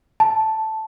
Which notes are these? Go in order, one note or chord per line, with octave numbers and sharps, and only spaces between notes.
A5